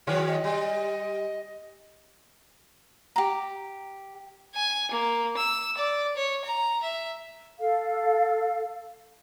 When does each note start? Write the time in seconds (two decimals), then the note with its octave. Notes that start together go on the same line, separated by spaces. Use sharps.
0.07 D#3 F#3 G#4 B4
0.27 D#5
0.44 G3
3.16 G4 A#5
4.55 G#5
4.91 A#3
5.37 E6
5.78 D5
6.16 C#5
6.45 A#5
6.83 E5
7.59 A4 F5